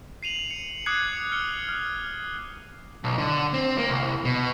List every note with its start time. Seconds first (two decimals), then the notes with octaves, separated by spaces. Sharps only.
0.23 C7 D#7 F7 F#7
0.51 C#7
0.86 D6 D#6 F#6 G#6 C7 C#7
1.32 F6 C#7 G7
1.69 F6
3.04 B1
3.18 D3
3.54 C4
3.78 A#3
3.90 C2
4.25 B2